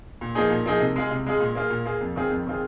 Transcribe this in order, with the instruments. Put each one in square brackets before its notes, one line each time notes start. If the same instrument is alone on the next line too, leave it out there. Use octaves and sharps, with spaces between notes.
[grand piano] A#2
F3 A#3 D#4 G#4
A#2
F3 A#3 D#4 G#4
C3
G#3 F4 G#4
C3
G#3 F4 G#4
A#2
A#3 F4 G#4
A#2
A#3 F4 G#4
F2
D#3 C4 F4 G#4
F2
D#3 C4 F4 G#4